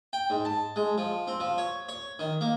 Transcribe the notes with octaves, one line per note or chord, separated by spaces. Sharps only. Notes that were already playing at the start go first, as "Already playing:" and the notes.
G5
G#2
A5
G#3
F3
C4
F3
C#5
C#5
D#3
A#3